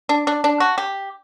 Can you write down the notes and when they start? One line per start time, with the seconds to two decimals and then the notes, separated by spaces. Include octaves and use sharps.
0.09 D4
0.27 D4
0.44 D4
0.60 F#4
0.78 G4